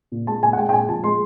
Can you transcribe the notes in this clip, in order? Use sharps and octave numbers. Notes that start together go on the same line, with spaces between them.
A#2
G#3 A5
A#2 G#5
F#5
G#3 G5
G5
A#2 G#5
F3 A5
G#3 C6